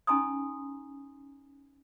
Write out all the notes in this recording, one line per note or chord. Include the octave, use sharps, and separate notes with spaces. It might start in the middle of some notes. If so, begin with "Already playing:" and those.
C#4 D#4 G#5 A#5 C6 D#6